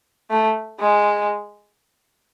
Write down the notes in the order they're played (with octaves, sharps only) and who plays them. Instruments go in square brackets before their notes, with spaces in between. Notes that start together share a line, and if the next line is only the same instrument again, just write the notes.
[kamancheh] A3
G#3